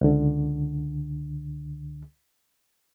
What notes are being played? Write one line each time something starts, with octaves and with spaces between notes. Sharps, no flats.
C#2 D3